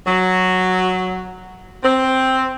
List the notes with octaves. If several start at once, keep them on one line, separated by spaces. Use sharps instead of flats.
F#3
C4